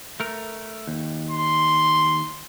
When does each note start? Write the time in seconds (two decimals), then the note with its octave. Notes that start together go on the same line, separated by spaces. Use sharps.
0.20 A3 A#4
0.88 D#2
1.31 C6